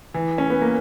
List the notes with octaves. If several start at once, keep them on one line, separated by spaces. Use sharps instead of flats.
E3
C#4
B3
A#3